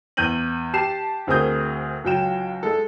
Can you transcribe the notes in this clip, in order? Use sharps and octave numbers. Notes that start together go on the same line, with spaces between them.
E2 G6 D#7 F#7
G4 A5 C7 E7
D2 C4 G#4 A#4 D#6 G6
C#2 F#3 G5 E7
G#3 A4